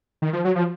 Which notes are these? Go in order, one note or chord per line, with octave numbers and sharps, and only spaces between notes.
D#3
F3
F#3
F3